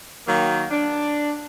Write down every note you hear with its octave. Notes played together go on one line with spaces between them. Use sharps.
D#3 F#3 A#3
D4